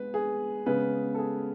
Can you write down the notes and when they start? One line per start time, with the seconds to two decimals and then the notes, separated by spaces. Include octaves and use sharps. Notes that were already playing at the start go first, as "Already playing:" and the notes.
Already playing: G#3 B3 B4
0.14 G#4
0.66 C#3 G#3 B3 B4
1.15 A4
1.18 G#4